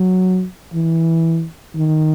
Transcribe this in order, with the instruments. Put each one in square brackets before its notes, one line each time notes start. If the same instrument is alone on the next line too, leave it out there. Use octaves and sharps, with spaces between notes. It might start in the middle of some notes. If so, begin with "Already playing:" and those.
Already playing: [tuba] F#3
E3
D#3